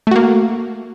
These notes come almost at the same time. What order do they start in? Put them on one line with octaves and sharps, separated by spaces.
A3 F#4 A#3